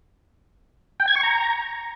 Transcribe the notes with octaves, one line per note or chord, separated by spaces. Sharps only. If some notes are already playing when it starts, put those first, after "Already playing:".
G5
G#6
C#6
A#5